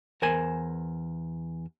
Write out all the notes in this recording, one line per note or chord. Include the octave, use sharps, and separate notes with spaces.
E2 A#4 C5 G#5